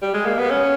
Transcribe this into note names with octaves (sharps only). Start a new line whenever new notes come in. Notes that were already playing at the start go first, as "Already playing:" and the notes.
G3
G#3
A#3
B3
C#4